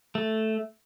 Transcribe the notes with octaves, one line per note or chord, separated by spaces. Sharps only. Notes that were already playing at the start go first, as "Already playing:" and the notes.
A3